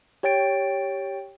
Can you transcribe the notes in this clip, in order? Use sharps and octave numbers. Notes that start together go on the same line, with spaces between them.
G4 C#5 G5 A6 D7